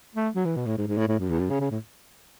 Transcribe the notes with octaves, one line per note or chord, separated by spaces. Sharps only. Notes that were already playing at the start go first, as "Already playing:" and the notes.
A3
F#3
E3
B2
A2
G#2
G#2
A2
A2
F#2
E2
F#2
C#3
C#3
A2